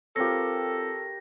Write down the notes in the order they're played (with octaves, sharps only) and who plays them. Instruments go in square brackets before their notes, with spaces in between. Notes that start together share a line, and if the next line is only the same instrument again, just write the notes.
[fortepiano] C4 F4 [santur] G4 A#4 C#5 [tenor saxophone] A4 [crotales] A#6